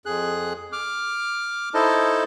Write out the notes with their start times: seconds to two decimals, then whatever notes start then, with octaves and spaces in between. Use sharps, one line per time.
0.06 F2 G#4 F#6
0.72 D6 F6
1.74 D#4 E4 A4 C5 D#5 A5